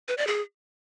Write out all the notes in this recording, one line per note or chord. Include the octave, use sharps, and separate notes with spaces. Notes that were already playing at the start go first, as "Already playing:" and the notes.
B4
D5
G#4